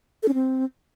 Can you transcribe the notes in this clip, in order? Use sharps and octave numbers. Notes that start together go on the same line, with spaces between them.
A4
C#4
C4